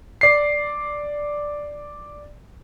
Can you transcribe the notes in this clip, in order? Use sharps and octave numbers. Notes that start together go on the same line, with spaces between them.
D5 C7